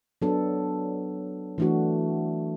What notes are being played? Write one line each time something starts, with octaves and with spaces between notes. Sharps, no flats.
F#3 B3 D4 A4
E3 A3 D4 F#4